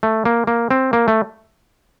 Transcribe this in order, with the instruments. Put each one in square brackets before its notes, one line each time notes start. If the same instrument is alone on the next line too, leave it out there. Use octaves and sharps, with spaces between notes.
[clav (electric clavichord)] A3
A#3
A#3
C4
A#3
A3